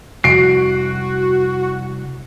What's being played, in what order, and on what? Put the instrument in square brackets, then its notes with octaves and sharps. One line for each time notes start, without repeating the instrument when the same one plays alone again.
[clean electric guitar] C2 [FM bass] F2 [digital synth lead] F#4 [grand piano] C7 D7